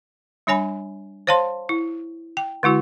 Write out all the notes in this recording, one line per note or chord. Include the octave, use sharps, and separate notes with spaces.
G3 D4 C#5 G#5 B5
C5 C#5 F5 A5 C6
E4
G5
D3 G#3 E4 F#4